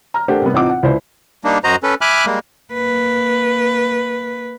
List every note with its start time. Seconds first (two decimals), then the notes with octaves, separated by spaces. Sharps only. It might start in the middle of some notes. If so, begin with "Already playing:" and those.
0.14 A#5 F6
0.28 A3 D4 G4 A#4 C5 F#5
0.42 C3 G3 B3
0.54 A1 C4 D#4 F4 F#5 D6
0.69 F#5
0.83 C#2 E4 C5 D5
1.44 G3 A#3 D4 D#4
1.64 F#2 F#4 C5 D#5 A#5
1.83 C#4 A4 B4
2.01 E5 G#5 B5 D6 F6 F#6
2.26 G3 G#3 A#3
2.73 A#3 B4